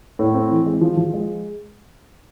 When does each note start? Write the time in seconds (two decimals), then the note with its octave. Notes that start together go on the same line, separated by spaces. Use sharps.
0.19 A2
0.34 C4
0.51 E3
0.66 G#3
0.81 F3
0.97 F3
1.14 G#3